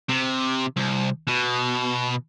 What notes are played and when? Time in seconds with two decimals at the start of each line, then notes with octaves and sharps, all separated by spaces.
0.09 C3
0.76 C2
1.27 B2